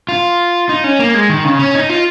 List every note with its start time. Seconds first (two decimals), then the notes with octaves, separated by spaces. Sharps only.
0.09 F4
0.69 D#4
0.84 C#4
0.99 A#3
1.14 G#3
1.29 D#3
1.44 C#3
1.59 C#4
1.75 D#4
1.89 F4